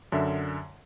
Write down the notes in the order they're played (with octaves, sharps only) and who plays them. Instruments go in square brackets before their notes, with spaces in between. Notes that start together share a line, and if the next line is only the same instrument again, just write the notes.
[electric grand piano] F#2 D3 E5